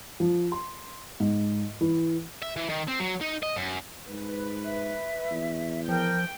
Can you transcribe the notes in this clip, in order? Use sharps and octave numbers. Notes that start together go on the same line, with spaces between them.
F3
C6
G#2
E3
E5
E3
D#3
C4
F#3
D#4
D#5
F#2
G#2 B4
E5
E2
F3 A#4 G5